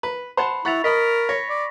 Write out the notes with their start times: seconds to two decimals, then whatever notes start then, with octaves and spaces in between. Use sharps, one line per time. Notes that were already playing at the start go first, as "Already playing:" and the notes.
0.03 B4
0.37 C5 F#5 A5 B5
0.65 E4 F#5 B5 C#6 A6 F7
0.84 A#4 D#5 B5 B6
1.29 C#5 C#6 A#6
1.50 D5